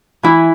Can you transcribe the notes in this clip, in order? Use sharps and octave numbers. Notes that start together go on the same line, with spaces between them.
E3 E4